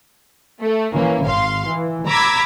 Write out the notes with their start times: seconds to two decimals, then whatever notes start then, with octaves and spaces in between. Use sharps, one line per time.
0.61 A3
0.93 E3 A#3 C#4
1.25 G#1 F5 C6
1.68 E3
2.07 A#5 B5 D6 E6 G#6 B6